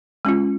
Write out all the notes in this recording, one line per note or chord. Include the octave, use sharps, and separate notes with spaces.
G#3 C#4 F4